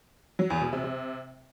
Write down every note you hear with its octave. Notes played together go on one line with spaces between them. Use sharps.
F#3
E2
B2
C3
C3